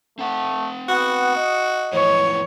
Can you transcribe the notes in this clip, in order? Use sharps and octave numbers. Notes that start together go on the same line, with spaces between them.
A3 C4 F#5
B3 F#4
D#5
F2 A2 E3 C#5